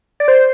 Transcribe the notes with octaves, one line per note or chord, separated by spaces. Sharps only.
D5
C5